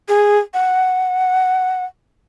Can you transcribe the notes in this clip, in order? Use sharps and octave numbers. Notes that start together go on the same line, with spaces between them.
G#4
F#5